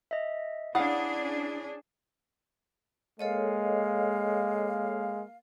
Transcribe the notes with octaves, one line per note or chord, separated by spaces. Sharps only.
D#5 E5
C#4 D4 E4 G#4 F5 F#5 D#6
G#3 A#3 A4 C#5 D#5 F5